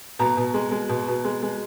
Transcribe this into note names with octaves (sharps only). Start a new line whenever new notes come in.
B2 A#5
B2
G#3
G#3
B2
B2
G#3
G#3